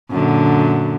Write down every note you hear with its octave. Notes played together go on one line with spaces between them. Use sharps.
F#2 A#2 D3